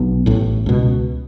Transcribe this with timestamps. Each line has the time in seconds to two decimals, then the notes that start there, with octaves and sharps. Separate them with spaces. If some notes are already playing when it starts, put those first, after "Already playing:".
Already playing: B1 B3
0.26 A1 A2
0.66 C#2 B2